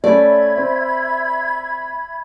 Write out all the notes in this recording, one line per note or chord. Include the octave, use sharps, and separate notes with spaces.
A3 C#4 D5 E5 B5 G#6
C4